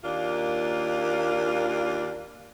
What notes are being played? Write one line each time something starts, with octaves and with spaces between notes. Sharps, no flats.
D#2 A#3 D4 F4